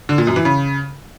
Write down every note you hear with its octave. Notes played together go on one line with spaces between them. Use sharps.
D3
A#2
F#2
E3
C#3